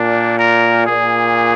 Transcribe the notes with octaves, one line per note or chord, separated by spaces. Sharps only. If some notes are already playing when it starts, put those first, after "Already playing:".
Already playing: A#2 D4
A#4
A#2 G#4